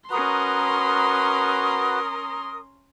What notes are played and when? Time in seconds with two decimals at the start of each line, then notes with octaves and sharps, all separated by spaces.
0.10 C#4 F#4 A#4 B4 A#5 C6 D#6